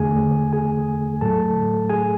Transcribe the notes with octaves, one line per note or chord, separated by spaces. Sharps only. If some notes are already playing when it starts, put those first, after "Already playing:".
Already playing: E2 D3 A3 G#4 G#5
G#4 G#5
A2 F#3 A3 A4 A5
G#4 G#5